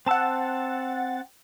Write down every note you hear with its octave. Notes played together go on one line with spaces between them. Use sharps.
C4 F#5 A5 E6 A6